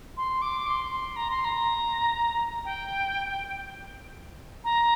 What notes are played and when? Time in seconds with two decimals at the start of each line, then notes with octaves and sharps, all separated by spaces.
0.17 C6
0.42 D6
0.67 C6
0.91 C6
1.16 A#5
1.31 C6
1.45 A#5
2.65 G5
4.64 A#5